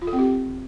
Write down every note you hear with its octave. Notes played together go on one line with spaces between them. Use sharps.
F4
A4
C4
G4